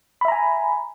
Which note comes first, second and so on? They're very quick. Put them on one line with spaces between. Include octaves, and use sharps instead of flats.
B5 E5 A#5 G#5